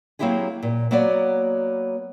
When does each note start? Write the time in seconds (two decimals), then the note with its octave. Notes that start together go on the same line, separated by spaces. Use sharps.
0.19 F#3 A#3 C4 E4 G4 G#4
0.63 A#2
0.91 F#3 A#3 B3 F#4 C#5 D5